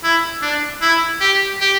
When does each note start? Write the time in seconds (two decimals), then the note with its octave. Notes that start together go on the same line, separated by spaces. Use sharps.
0.03 E4
0.42 D4
0.81 E4
1.20 G4
1.61 G4